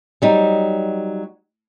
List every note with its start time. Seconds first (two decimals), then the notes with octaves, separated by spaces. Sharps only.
0.22 F#3 G3 D#4